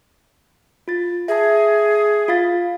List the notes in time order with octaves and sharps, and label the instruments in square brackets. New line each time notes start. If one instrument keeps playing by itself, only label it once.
[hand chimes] F4 A6
[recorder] G#4 [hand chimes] E5 A5
[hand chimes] F4 F5 A6